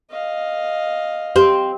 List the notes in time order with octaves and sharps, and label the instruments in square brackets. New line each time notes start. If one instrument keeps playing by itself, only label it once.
[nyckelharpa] D#5 F5
[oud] C4 [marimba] G4